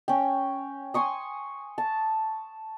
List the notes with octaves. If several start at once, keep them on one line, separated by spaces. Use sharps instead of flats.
C#4 G5
G#5 C6 C#6 D#6
A5